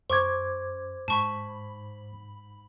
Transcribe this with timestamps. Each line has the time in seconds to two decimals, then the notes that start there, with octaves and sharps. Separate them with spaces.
0.10 F#2 C5 C#6 D6 G#6
1.08 G#2 A5 B5 C#6